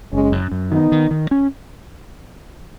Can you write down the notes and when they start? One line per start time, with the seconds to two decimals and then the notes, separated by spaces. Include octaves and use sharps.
0.12 F#1 G#3 C#4
0.32 F#2
0.52 F#2
0.72 D#3 B3 D#4
0.92 D#3
1.11 D#3
1.31 C#4